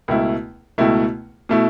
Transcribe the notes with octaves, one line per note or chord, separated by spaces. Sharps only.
C#2 B2 A3 E4
C#2 B2 A3 E4
B2 A3 E4